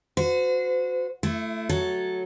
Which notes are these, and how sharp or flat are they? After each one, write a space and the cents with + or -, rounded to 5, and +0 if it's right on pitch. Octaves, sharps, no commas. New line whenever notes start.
F#4 -25 C5 -40
A3 +0 E4 +35
F#3 +0 A4 -5 C#5 +0